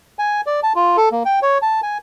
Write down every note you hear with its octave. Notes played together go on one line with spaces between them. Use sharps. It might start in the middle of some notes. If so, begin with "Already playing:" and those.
G#5
D5
A5
F4
A4
A#3
G5
C#5
A5
G#5